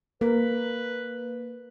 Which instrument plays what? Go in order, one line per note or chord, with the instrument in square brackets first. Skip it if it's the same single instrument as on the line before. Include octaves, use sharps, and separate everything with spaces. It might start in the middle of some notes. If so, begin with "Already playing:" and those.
[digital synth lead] A#3 [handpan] A#4 [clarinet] B4